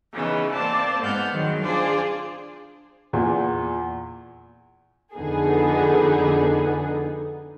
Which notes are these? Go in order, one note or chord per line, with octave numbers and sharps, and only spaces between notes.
C#3 E3 B3 D#4
A#3 C4 C5 D5 A5
G#2 B3 F#5 F6 G6
D#3 F#3 G#3 C4
D4 F4 G#4 C5 D5
E2 A#2
F2 D3 B3 D#4 G#4 A4